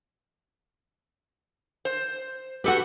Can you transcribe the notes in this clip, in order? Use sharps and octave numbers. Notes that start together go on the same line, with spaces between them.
C5
F#4 G4 A4 B4 E5 F#5